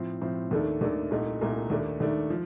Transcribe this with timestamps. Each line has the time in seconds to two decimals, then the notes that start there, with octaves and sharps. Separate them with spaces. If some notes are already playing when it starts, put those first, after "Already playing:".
Already playing: A2 F3 C4
0.21 A2 F3 C4
0.51 D#2 D#3 A3 D4 A4
0.81 D#2 D#3 A3 D4 A4
1.11 C2 A#2 A3 D#4
1.41 C2 A#2 A3 D#4
1.70 D#2 D#3 A3 D4
2.00 D#2 D#3 A3 D4
2.30 F3